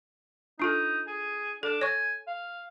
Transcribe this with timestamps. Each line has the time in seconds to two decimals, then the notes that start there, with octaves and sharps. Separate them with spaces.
0.59 D4 D#4 F4 A4
1.07 G#4
1.63 D4 A4
1.81 C#5 G#5 C#6
2.27 F5